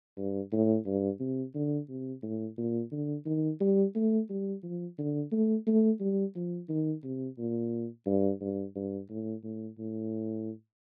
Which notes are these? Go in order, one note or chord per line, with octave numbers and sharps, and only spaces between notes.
G2
A2
G2
C3
D3
C3
A2
A#2
D3
D#3
G3
A3
G3
F3
D3
A3
A3
G3
F3
D#3
C3
A#2
G2
G2
G2
A2
A2
A2